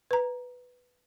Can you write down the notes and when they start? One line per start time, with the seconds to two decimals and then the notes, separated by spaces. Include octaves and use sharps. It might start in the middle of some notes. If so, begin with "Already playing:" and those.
0.11 B4 A#5